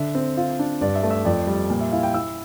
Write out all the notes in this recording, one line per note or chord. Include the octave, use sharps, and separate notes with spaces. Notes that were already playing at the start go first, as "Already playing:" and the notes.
Already playing: D3 D4 E5
C4
F4
D4
G2 D5
E5
A3
E5
F2 D5
G3
A#2
E5
E4 F5
G5
E4 E6